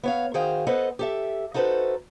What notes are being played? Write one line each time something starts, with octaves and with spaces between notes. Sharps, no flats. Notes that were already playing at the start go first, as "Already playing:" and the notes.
B3 C#5 F5
D#3 F#4 G#4 C5 F5 G5
B3 A4 B4 C5 D#5 F#5
G4 A4 E5
D#4 F#4 A4 B4 C5